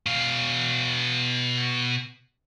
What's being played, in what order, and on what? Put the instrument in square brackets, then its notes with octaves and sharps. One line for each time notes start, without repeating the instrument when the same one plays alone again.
[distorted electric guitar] B2 F5